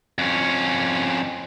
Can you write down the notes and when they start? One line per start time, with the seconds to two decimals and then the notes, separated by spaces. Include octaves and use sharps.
0.18 F2 C#4